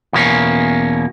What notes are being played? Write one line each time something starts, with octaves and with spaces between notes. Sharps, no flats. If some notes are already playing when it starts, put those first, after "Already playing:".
E2 B2 A#3 C#4